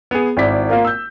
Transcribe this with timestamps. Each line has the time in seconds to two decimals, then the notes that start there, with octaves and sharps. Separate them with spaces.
0.11 B3 G#4
0.37 G#1 E4 D5 B6
0.69 A#3 F4 A#4
0.85 E6 G6